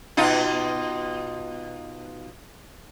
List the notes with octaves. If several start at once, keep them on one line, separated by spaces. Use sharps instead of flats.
B2 D#4 F4